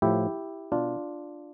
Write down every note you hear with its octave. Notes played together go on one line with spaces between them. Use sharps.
A2 F3 E4 G4
B2 D4 F4